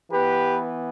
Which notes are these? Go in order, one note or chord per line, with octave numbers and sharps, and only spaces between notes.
E3 B3 G4 B4